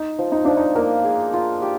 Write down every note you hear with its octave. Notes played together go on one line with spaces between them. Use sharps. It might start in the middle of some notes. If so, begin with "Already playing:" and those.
Already playing: D#4
F3
D#4
F3 D4
D#4
A#3 A#4
G#4
F4
G4